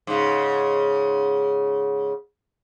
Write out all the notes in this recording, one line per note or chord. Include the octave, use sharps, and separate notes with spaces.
G#2 C#3